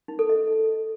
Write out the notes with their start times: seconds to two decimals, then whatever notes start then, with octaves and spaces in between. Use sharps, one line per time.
0.08 D#4
0.19 A4
0.29 D#5